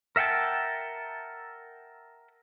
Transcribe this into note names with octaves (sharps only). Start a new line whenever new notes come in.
A#4 E5 F#5 G5 A5